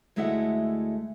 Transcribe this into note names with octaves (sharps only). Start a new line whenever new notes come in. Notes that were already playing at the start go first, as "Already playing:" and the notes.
D2 G#3 A3 E4 E5 F#5